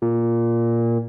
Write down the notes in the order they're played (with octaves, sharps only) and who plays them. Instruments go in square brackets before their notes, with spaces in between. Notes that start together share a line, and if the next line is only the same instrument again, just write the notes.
[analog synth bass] A#2